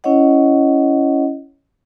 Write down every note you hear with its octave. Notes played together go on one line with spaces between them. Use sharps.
C#4 E4 C#5 D#5 F#5